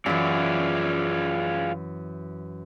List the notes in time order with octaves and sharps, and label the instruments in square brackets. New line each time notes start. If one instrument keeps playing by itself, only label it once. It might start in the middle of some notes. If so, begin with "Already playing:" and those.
[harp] F#2 E3 [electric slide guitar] F4 G#4 D5